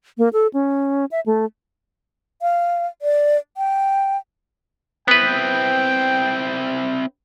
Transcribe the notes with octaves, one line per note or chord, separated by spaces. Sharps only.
A#3
A4
C#4
E5
A3
F5
D5
G5
B3 C4 E4 B4 G5